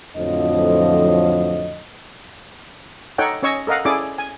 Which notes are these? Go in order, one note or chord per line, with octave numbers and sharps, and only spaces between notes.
F2 A2 D3 F3 F#3 D#5
D#4 A4 C#5 F#5 G5
C#4 C#5 D#5 C#6 E6
A4 A#4 D#5 F5 F#5
C#4 E4 G#4 A4 D5 D6
G#5